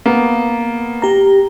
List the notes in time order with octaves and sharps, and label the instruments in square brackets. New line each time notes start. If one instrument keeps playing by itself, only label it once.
[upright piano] A#3 B3
[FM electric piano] G4 A#5